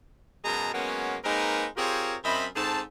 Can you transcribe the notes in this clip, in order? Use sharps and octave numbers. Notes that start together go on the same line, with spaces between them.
F#2 B2 G#3 G#4 A5 A#5
F#3 G#3 A#3 B3 C#4
G#3 A#3 C4 D#4 A#4 B4
C4 F4 G4 G#4 A#4 C#5
F#2 C4 D#5 E5 B5
G#2 C4 G#4 A4 A5